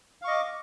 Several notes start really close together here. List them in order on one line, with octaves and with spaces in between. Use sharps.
F5 C#6 D#5 D6